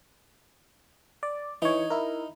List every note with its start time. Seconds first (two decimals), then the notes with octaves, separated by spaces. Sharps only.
1.23 D5
1.62 E3 D#4 C#5
1.90 E4 A#4